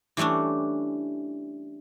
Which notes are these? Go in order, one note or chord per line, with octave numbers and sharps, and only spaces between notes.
E3 G3 A3 C#4 D4